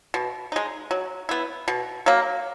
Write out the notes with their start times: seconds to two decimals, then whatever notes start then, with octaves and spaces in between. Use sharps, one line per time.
0.14 B2
0.52 G#3 D#4
0.91 F#3
1.29 B3 E4
1.68 B2
2.06 F#3 A#3